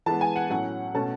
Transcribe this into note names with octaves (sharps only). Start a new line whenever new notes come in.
E3 G#3 B3 A5
G#5
F#5
A2 F#3 C#4 F#5
B2 A3 C#4 A5